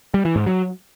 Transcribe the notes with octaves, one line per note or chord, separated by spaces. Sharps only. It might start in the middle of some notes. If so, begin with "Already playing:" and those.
G3
E3
G#2
F#3